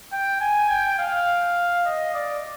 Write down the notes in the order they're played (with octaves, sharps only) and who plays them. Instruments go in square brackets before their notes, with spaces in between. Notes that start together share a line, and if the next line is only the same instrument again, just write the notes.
[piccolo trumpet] G5
G#5
G5
F5
D#5
D5